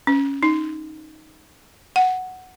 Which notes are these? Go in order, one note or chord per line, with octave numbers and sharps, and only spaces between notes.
C#4
D#4
F#5